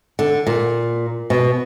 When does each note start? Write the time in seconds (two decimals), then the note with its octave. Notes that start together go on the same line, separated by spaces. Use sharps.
0.19 D3
0.47 A#2
1.30 B2